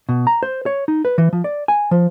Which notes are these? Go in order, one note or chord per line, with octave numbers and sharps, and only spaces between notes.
B2
A#5
C5
C#5
D#4
B4
E3
F3
D5
G#5
F3